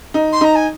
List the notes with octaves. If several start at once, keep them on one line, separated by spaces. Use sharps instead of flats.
D#4
C6
D#4 A#5
G#5